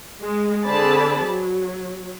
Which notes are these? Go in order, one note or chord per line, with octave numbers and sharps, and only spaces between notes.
G#3
D3 C4 G#4 D5 A5 B5
F#3